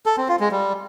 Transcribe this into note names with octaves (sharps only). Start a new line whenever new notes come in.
A4
C4
F4
G#3
G3